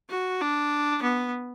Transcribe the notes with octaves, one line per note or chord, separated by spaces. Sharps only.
F#4
D4
B3